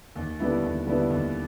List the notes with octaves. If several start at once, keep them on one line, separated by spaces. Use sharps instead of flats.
D#2
D3 G3 B3 E4
D#2
D3 G3 B3 E4
D#2